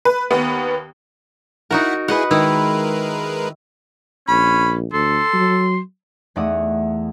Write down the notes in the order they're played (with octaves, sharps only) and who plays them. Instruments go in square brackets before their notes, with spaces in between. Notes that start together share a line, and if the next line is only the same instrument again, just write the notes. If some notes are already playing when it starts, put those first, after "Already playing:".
[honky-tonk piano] B4
D#2 B3
[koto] D#4 F#4 A#4 [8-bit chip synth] E4 F#5
[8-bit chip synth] E4 G#4 [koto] B4 D#5 F#5
[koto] D#3 E4 [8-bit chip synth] G#3 A#4 B4
[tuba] A#1 [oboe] C#4 [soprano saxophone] B5
[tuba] D2 [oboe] A4 [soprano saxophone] C6
[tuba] F#3
[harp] E2 A3 D#4 D5 F#5 D#6